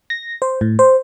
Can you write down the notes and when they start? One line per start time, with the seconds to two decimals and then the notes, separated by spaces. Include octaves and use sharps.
0.10 A#6
0.42 C5
0.61 A2
0.79 C5